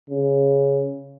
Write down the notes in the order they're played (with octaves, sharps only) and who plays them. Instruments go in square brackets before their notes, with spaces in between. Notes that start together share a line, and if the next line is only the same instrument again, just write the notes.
[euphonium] C#3